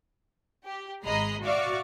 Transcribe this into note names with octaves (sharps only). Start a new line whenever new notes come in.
G4
G#1 G#3 D#5 A#5 B5 C7
F#4 D5 E5 F5 C#6 D6